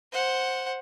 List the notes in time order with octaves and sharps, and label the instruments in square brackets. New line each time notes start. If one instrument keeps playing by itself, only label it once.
[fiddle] C5 F#5